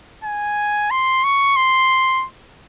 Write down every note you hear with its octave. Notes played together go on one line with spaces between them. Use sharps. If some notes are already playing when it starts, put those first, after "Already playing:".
G#5
C6
C#6
C6